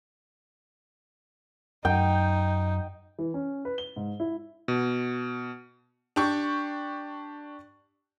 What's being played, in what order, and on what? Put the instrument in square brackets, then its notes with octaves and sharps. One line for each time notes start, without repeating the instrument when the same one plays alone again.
[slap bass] F#2 [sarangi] D#4 [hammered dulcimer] G5
[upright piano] E3
C#4
B4
G7
G#2
E4
[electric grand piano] B2
[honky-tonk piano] D4 G4 C#6